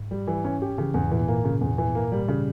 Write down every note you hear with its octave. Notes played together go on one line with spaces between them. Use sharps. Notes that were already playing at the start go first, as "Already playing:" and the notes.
Already playing: G#2
G3
E3
C#4
G4
C#3 E3
E2 G#2
A#2 E3
A#2 A#3
C#3
E2
E3
A#3
G3
C#3